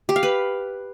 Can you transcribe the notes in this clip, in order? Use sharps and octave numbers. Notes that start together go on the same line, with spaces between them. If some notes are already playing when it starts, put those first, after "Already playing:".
G4
F5
B4